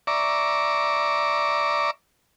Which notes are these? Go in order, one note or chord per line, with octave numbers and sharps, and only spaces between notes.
D5 E5 A#5 C#6 D6